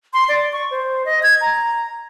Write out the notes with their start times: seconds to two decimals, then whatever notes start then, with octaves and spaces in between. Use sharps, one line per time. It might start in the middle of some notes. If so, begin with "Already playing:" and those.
0.14 C6
0.29 D5
0.53 C#6
0.71 C5
1.05 D#5
1.23 G#6
1.41 A#5